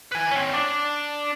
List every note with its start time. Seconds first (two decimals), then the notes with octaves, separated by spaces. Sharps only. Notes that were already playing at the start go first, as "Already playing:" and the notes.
0.12 B4 G#5
0.31 C4 C#4
0.53 D4